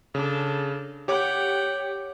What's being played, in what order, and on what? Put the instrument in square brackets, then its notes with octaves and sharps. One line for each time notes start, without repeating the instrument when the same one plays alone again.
[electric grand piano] C#3 [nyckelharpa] D4 A4
[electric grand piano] G4 C#5 D6 [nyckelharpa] F#5 G5